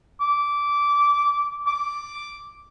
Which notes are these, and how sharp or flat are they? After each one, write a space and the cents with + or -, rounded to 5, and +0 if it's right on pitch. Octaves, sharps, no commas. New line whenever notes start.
D6 -15
D6 +0